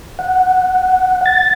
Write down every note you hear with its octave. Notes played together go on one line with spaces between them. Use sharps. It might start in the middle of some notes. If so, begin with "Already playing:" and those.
F#5
A6